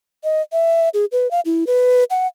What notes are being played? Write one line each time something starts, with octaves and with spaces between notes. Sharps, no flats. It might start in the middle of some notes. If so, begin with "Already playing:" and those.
D#5
E5
G#4
B4
F5
E4
B4
F#5